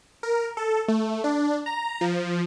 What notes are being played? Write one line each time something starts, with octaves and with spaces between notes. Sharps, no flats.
A#4
A4
A3
D4
A#5
F3